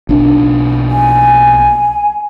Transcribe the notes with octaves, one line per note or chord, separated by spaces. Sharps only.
B1 D4
G#5